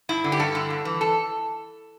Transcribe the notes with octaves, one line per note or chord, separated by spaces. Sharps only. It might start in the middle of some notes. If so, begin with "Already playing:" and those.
G2 E4
D3
G4
G2 A4
D3
G2
E3
A4